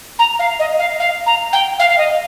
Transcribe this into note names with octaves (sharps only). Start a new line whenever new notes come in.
A#5
F5
D#5
F5
F5
A#5
G5
F5
F5
D#5